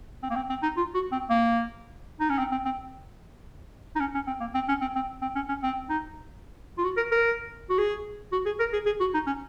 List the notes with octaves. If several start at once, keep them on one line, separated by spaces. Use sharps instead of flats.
C4
A#3
C4
C4
D#4
F4
F#4
C4
A#3
D#4
C#4
C4
C4
C4
D#4
C#4
C#4
C4
A#3
C4
C#4
C4
C4
C4
C#4
C#4
C4
D#4
F4
F#4
A#4
A#4
F#4
G#4
F#4
G#4
A#4
G#4
G#4
F#4
D#4
C#4